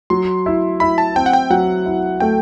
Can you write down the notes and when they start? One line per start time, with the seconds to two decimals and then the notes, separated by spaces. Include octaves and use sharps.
0.10 F#3 C6
0.46 E4
0.80 E4 B5
0.98 A5
1.16 C4 G5
1.26 F#5
1.33 G5
1.50 F#3 F#5
1.86 E4
2.20 A3 G5